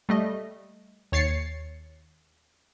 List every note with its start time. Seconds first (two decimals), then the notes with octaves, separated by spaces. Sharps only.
0.09 G3 A3 D#5
1.12 D#2 C#5 A6 C7 C#7